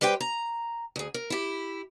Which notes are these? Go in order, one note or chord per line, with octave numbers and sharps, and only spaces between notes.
G3 G4 B4 C5 G5
A#5
D2 G#4
A#4
E4 G4